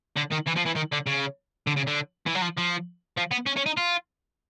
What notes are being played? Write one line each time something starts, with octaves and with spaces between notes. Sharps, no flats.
D3
D#3
E3
F3
E3
D#3
D3
C#3
D3
C#3
D3
E3
F#3
F3
F3
F3
B3
C#4
C#4
D#4
F4